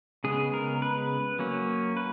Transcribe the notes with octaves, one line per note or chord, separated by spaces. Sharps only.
C#3 G#3 B3 G#4
A#4
B4
F#3 A#3 C#4
B4